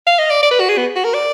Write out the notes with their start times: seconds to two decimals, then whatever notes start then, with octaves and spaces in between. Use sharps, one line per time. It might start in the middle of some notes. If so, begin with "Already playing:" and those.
0.07 F5
0.19 D#5
0.30 D5
0.43 D5
0.51 B4
0.60 F#4
0.69 G#4
0.77 B3
0.96 F#4
1.04 A#4
1.14 D5